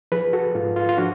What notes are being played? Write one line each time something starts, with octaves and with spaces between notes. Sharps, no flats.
F3 G#4 B4
F#4 A4
G#2 F4
F4
F4
F3 D4 F#4